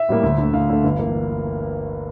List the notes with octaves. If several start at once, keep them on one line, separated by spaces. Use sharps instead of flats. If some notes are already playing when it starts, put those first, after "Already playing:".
Already playing: E5
A2 G3 A#3
D2
D3
A3
D2 F5
D3 A3
G1
E3 A#3